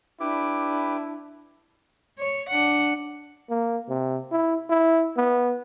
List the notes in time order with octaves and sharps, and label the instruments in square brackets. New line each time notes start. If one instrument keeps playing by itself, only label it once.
[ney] D4 [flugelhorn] E4 [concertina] G4 B4 D6
[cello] C#5
D4 F#5
[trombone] A#3
C3
E4
E4
B3